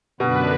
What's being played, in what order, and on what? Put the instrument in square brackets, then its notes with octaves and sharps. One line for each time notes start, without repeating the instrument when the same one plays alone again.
[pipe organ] F#2 D3 B3 D4 B4 [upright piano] B2